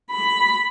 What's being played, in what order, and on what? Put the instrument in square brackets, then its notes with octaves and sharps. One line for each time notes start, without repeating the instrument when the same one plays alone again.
[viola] B5